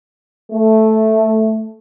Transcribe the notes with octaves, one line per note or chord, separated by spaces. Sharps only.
A3